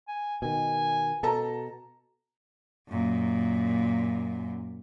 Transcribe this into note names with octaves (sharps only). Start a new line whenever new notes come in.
G#5
B2 D#3 G#5
B2 A4 A5 A#5
F#2 A#2